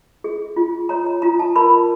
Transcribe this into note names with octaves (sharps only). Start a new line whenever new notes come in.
G#4
F4
C#5 A#5
A#5
F4 A#5
A5
A#4 B5